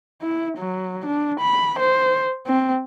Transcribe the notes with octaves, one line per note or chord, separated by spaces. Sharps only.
E4
F#3
D4
B5
C5
C4